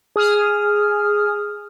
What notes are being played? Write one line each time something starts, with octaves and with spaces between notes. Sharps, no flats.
G#4 D#6 F6